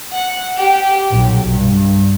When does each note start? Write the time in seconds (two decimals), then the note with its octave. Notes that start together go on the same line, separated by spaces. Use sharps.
0.13 F#5
0.58 G4
1.10 B1
1.48 G2